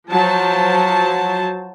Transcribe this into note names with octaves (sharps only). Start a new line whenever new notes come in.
F3 F#3 C5 A5